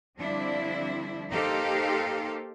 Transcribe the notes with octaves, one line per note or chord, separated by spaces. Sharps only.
D3 F3 G3 C4 D4 E4
A#3 D#4 G4 A4 C5 F5